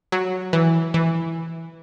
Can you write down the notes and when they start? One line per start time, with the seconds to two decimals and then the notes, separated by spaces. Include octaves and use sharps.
0.12 F#3
0.53 E3
0.94 E3